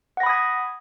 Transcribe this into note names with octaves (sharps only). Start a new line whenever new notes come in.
F#5 B5 D#6 G#6 A#6